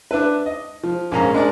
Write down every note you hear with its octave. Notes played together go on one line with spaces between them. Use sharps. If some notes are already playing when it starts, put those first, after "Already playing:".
D4 E4 B4
D#5
F3
A#1 G#2 A#3 C#4 F5 A#5
G#3 D4 A#4 D5